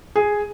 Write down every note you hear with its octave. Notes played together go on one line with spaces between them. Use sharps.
G#4